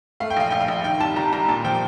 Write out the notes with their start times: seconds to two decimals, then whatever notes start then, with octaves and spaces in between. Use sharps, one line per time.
0.20 A3 F5
0.30 G5
0.37 A#1 F5
0.50 A#1 G5
0.60 F5
0.68 A#1
0.84 D#3 G5
1.00 C2 A5
1.16 C2 A#5
1.33 C2 A#5
1.48 A#2 A5
1.65 F3 G5